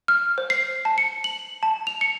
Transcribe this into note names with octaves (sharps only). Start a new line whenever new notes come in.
F6
C5
C7
A5
C#7
F#7
A5
F7
C#7